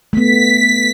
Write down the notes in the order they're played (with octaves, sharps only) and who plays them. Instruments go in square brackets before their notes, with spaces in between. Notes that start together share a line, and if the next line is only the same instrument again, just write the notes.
[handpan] A3 B3 [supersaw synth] B6